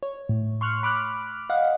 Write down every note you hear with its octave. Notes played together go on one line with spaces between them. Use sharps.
C#5
A2
C6 C#6 F6 F#6
B5 D6 F6 F#6
D#5 F5 F#5